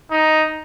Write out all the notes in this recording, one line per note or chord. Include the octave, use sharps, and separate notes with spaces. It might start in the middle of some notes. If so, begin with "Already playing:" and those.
D#4